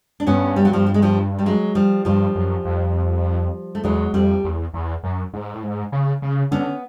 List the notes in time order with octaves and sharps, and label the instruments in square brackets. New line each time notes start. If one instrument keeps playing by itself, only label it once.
[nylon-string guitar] D4
[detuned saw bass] G2 [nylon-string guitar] B3 C#4
[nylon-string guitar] G3
F#3
F3 G3
G3
G#3
F3 G3
G3
F#3 G#3
F3 G3
[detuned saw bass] G2 [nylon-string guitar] F3 G3
[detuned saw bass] F#2
F2
[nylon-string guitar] A3
[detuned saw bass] E2 [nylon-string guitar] F#3 G#3
[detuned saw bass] F2 [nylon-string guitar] G3 A3
[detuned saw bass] E2
E2
F#2
G#2
A2
G#2
C#3
C#3
[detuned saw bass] D3 [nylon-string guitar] B3 C#4